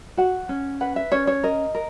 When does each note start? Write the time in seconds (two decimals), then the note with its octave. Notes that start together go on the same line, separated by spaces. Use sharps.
0.17 F#4 F#5
0.49 C#4
0.81 B4 F#5
0.96 E5
1.12 C#4 C#5
1.27 C#5
1.43 A#4 D#5
1.75 A#4